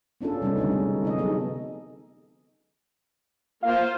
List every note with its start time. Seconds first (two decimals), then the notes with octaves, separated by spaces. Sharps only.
0.21 B3 C#4 D4 F4 A4
0.42 C3 G3 A3 C4 C#4 D#4
0.57 D3 G#3 D4 D#4
0.72 C3
1.03 F3 D#4 D#5
1.17 F#3 B3 D#4 G#4 A4
3.63 A#3 F4 C5 F5